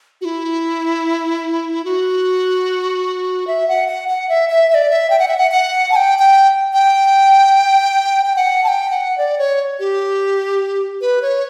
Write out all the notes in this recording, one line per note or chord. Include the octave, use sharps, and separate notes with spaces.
F#4
E4
F#4
E5
F#5
F#5
F#5
E5
E5
E5
D5
E5
G5
F#5
E5
F#5
F#5
A5
G5
G5
G5
G5
F#5
A5
G5
F#5
D5
C#5
G4
B4
C#5